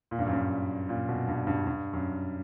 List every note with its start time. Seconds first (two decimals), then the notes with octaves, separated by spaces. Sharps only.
0.11 A#2
0.19 G2
0.26 F#2
0.33 G2
0.89 A#2
1.09 B2
1.27 G2
1.47 G2
1.67 G2
1.93 F#2